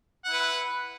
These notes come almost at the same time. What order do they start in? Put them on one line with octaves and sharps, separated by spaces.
F#5 E4 B4